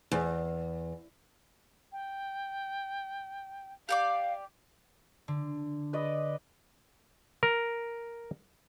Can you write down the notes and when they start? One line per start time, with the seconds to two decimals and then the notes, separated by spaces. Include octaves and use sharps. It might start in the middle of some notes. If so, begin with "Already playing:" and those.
0.11 E2
1.92 G5
3.89 G4 D5 F5 D6
5.28 D3
5.93 B4 D5 D#5
7.43 A#4